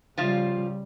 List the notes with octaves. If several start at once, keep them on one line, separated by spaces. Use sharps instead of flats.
C#3 F3 G3 F4